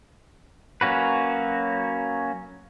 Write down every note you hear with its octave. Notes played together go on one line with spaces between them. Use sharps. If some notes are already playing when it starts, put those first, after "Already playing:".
F#3 A#3 C#4 F#4 B4